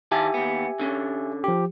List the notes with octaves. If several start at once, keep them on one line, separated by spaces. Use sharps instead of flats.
D#3 E4 G4 E5 G#5 A5
D#2 B3
D3 C#4
F3 G4